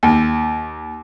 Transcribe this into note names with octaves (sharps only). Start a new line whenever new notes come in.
D#2